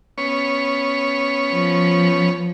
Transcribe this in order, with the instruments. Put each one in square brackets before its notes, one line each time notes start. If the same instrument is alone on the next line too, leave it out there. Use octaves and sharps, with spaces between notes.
[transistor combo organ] B3 C#4 C#5
[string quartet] F3